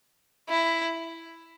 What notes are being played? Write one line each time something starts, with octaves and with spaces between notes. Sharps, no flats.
E4